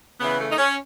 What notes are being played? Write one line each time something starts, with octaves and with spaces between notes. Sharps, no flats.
C#3 E3 B3
A3
D#4
C#4